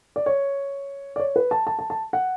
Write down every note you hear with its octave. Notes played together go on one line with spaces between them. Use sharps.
D5
C#5
D5
C#5
B4
A5
A5
A5
A5
F#5